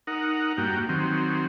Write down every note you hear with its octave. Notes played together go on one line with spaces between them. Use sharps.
D#4 A#4 F#5
G2 A#3 F#4 G5
D#3 F#3 C4